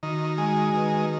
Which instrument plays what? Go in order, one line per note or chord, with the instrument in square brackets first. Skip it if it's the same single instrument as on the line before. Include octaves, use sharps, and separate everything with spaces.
[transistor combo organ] D#3 [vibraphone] F#4
[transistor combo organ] G#3 [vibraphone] F#4
[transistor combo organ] D#3 [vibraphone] B4 D#5